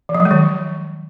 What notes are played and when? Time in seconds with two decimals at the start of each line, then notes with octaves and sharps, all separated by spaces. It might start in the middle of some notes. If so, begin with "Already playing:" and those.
0.09 E3
0.15 F3
0.20 F#3
0.25 G#3
0.31 D#3